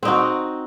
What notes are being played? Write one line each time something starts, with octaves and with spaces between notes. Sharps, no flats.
C4 D#4 F#4